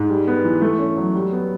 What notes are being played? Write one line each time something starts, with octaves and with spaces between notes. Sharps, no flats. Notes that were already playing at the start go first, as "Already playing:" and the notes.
Already playing: G#2
G3
B3
E3
A3
C#4
F#3
G3
B3